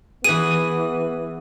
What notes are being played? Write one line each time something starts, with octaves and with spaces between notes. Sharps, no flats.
E3 B3 G#4 D#7